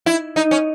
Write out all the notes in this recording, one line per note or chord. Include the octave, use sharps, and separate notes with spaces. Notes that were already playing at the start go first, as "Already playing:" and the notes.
E4
D#4
C#4